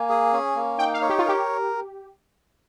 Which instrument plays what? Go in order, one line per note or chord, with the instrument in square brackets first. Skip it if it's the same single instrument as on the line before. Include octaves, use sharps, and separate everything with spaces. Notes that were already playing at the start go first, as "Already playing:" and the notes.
Already playing: [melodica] A#3 [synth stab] G#5
[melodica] G#4
C#4
A#3
[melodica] D#4 [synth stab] G5
[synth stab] F5
[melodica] C#5
[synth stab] G4
F4
[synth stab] G4 [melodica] A#4